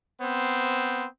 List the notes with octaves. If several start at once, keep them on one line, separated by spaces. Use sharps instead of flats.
B3 C4 C5